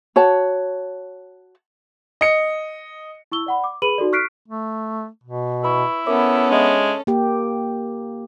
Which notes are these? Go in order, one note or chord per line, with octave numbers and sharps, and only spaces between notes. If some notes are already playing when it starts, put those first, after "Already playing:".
F#4 C#5 A5
D#5 C#7
E4 C#6 E6 G7
D5 F#5 B5
D6
G#4 B4 B5 D#7 F#7
D#4 F#4 A4 D5
C#6 F6 F#6 B6 C7 D7
A3
B2
E4 B4 B5 C#6
B3 C#4 A4 A#4 E5 D6
G#3 D4 D#5 E5
A#3 G4